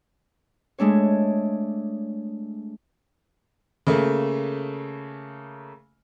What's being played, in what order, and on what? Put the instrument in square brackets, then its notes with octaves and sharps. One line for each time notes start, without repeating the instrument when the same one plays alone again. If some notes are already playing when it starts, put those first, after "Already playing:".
[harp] G#3 A3 D4 C#5
[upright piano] C#3 A3 A#3